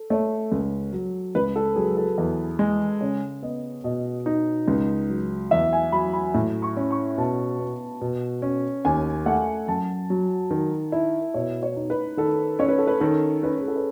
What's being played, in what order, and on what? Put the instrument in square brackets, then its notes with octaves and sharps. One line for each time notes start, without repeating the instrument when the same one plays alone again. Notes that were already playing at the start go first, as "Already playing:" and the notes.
Already playing: [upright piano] A4
[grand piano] A3 [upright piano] C#5
[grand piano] C#2
F#3
[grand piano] C#2 [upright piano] B4
[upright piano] A4
[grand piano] F#3 [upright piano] G#4
[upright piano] A4
[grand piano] E2
G#3
[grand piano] C#3 [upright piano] C#5
[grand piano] B3 [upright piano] D#5
[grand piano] B2 [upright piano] D#5
[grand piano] D#4
C#2
F#3
[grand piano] E2 [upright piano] E5
[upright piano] G#5
[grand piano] F#3 [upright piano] B5
[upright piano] B5
[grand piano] A2 [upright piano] B5
[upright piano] C#6
[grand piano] C#4
[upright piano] C#6
[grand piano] B2 [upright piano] A5
[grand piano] B3
B2
C#4
[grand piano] D#2 [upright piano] G#5
[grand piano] A3 [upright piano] F#5
[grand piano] F#2 [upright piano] A5
[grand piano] F#3
D#3
E4
[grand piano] B2 [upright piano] C#5
[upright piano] C#5
[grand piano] D#4
[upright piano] B4
[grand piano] D#3 [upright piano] A4
[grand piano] C#4 [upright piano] C#5
[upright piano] B4
A4
B4
[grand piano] D#3 [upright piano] A4
[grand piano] C#4 [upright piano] B4
[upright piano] G#4
A4
B4